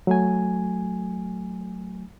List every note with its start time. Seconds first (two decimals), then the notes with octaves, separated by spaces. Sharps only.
0.07 F#3 A3 G#5